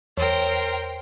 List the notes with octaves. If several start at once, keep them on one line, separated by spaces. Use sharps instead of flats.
E2 A#4 C5 C#5 G5